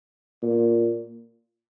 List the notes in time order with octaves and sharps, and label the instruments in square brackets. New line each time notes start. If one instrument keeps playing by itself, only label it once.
[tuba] A#2